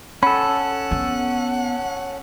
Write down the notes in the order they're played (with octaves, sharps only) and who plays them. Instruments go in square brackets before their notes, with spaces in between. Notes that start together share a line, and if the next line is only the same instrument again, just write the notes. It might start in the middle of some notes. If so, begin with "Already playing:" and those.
[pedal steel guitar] C#4 A4 [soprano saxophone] F#5 [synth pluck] B5
[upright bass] B3